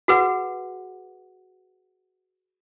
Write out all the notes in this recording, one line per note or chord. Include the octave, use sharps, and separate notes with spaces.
F#4 G#4 B4 F#5